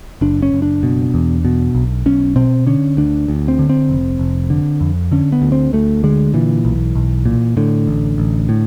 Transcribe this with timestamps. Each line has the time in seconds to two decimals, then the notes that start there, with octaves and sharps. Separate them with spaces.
0.21 F#1 D4
0.42 C#4
0.52 F#1
0.62 D4
0.83 B2
1.14 E2
1.45 B2
1.75 B1
2.06 B1 C#4
2.36 B2 C4
2.67 D3 C#4
2.97 D2 D4
3.28 D2
3.48 C4
3.59 D3
3.69 C4
3.90 F1
4.19 F1
4.50 D3
4.81 F2
5.12 D3 C#4
5.32 B3
5.42 D2
5.52 C4
5.73 D2 A3
6.04 D3 G#3
6.34 A#2 E3
6.65 B1
6.95 B1
7.25 A#2
7.57 A2 D3
7.87 A1
8.18 A1
8.49 A2